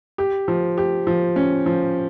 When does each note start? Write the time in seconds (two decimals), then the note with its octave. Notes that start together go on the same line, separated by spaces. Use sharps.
0.18 G4
0.48 F3
0.77 G4
1.07 F3
1.36 C#4
1.66 F3